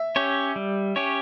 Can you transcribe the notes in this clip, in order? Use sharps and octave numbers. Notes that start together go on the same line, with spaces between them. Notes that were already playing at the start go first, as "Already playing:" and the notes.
Already playing: E5
C#4 G4 C#5
G3
C#4 G4 C#5